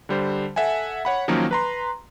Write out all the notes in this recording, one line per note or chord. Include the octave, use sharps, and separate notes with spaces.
D3 G3 C5
A4 E5 F#5 G#5
C#5 F#5 B5
D#3 F3 F#3 A#3 C#4
B4 A#5 C6